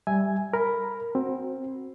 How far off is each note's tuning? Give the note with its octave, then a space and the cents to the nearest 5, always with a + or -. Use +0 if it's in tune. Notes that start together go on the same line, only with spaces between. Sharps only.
G3 +0 E5 +0 G#5 +0
A#4 +0 B5 +0
C4 +15 F#4 +0